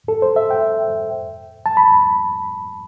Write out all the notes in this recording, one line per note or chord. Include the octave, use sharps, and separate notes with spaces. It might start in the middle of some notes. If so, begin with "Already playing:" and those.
A4
C5
E5
G5
A5
B5